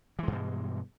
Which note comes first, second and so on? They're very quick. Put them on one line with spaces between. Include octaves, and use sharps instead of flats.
E3 G#3 G2 B2